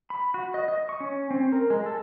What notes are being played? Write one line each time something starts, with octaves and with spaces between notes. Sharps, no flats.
B5
F#4
D#5
D#5
C#6
C#4
C4
A#4
G#3
A4